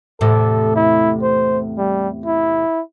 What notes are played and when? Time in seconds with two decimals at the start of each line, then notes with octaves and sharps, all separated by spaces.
0.21 E2 A2 C3 A4
0.76 E4
1.23 C5
1.78 G3
2.26 E4